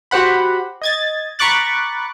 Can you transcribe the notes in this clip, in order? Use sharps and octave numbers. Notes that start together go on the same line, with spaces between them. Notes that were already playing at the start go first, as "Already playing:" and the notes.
F#4 G4 C5 F#5 B5
D#5 G#6 A6
A#5 B5 C#6 D6 F#6 A6